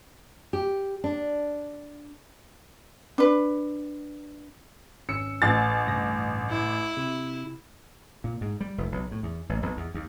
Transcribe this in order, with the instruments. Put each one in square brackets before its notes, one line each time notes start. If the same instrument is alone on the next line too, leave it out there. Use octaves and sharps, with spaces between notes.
[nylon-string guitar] G4
D4
[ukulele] D4 B4
[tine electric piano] G#1 C#4 E6 [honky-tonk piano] C#7
[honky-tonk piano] A1 A6
[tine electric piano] C2 G2 A#6
[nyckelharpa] E4
[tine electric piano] C3
[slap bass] A#2
G#2
G3
F1
B1
A2
E2
A1
B1
E2
D#2